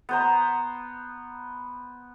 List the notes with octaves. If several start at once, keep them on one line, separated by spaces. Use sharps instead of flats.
B3 C5 A#5